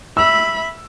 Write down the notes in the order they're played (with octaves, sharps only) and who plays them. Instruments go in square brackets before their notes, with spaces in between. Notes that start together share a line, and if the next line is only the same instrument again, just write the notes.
[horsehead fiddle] E5 B5 [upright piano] E6